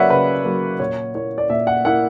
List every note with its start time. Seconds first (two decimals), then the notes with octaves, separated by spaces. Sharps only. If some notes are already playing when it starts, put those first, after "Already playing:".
Already playing: C#3 F#3 A#3 B4 C#5 D5 E5 F#5
0.10 C#3 B4
0.45 F#3 A#3
0.80 A#2 C#5
1.14 A#3 E4 C#5
1.38 D5
1.49 A#2 E5
1.67 F#5
1.85 A#3 E4 F#5